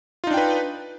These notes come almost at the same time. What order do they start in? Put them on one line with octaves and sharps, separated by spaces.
F4 D#4 D4 G5 B4